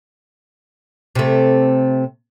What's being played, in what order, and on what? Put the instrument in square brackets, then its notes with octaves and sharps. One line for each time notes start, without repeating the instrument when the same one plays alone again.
[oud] C3 A3